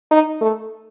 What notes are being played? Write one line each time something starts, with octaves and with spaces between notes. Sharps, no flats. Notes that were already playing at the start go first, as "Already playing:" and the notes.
D#4
A3